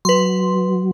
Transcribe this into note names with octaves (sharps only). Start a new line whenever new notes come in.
F#3 B4 C6